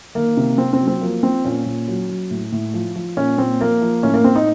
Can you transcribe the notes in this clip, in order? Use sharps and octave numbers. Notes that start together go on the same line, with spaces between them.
D#3 A#3
C3
C3 C4
C4
F#3
C4
F3 A#3
F3 C4
A#2 C#4
A#2
F#3
F#3
A2
A2
F3
F3
A#2 C#4
A#2 C4
F3 A#3
F3
A2 C#4
A#3
A2 C4
D#4